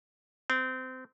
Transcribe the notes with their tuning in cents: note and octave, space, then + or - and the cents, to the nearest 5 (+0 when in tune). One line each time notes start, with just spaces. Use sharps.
C4 -25